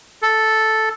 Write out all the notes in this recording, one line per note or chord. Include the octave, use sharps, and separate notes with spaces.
A4